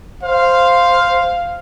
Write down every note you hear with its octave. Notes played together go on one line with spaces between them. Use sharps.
C5 F5